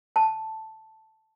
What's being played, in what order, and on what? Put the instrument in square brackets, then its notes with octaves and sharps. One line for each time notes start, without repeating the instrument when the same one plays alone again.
[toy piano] A5